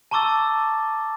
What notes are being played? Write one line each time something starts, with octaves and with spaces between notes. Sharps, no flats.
A5 A#5 C#6 D6 E6 A6